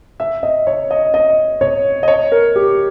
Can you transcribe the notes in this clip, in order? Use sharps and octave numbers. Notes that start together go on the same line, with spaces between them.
E5
D#5
C#5
D#5
D#5
C#5
D#5
C#5
A#4
G4